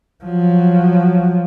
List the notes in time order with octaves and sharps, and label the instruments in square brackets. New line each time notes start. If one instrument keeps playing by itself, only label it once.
[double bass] F3 F#3